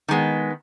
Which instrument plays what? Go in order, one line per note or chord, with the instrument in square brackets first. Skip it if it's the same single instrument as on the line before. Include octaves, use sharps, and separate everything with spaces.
[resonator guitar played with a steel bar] D#3 G#3 B3